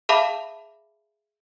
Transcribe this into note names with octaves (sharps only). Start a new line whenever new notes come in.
G#4 E5 F5 A5 B5 D6